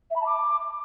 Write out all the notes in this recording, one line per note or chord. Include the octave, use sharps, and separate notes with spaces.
E5
B5
A5
D6